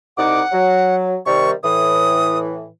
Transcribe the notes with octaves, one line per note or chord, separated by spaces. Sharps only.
C2 D#4 F#5 D6
F#3
C3 D#3 G3 C#6
A2 E3 D#6